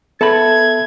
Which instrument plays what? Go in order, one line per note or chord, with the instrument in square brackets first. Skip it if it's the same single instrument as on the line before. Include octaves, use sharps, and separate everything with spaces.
[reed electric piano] B3 E5 A5 [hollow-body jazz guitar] A4 B5 [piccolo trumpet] G#6